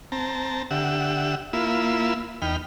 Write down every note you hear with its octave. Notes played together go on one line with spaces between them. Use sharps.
C4 A5 A#5
D3 G4 E5 F#5 E6
A#3 E4 F4 B5 E6
E2 D#4 G5 B5 F6